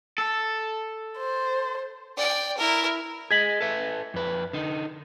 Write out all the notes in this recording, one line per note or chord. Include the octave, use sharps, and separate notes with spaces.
A4
C5
D5 G5
E4 A#4
G#4 D#5 G#6 B6 F#7
A4 B4 E5
F2 B4
D3 D#4